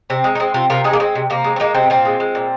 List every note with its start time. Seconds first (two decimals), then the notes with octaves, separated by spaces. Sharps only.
0.10 C3 C4
0.24 G#3
0.35 D#4
0.40 G#3 C4
0.54 C3 C4 F4
0.70 C3 F4 A#4
0.84 G#3 D#4 G#4
0.93 A#3
1.00 G#3 C4
1.15 C3
1.30 C3 A#3
1.44 G#3
1.56 C4
1.60 G#3 A#3 D#4
1.74 C3 C4
1.90 A#2 C4 F4
2.05 G#3
2.20 G#3
2.35 A#2